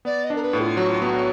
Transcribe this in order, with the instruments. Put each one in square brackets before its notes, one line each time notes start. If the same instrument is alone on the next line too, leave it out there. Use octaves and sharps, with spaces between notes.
[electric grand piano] B3 [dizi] D5
[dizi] D#5
[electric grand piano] D4 [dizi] A#4
[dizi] B4
[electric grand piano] A2
[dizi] F4
[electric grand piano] F#3 [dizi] F#4
[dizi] F4
[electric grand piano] B3 [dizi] F#4